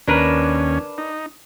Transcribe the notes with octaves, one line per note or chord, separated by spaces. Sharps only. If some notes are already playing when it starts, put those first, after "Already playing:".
D#2 C#4 D4 A#4 B4
D#4